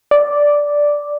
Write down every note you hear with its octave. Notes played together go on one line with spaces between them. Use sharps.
D5